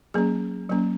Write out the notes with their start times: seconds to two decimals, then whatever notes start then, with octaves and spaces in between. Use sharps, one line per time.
0.14 F#3 A#3 C#4 G#4
0.70 F#3 A#3 C#4